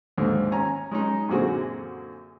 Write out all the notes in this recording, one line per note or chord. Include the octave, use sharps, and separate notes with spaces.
D#2 G#2 D3
C#4 G#5 A#5
G#3 C#4 D#4
F#2 A#2 D3 C4 F#4 G#4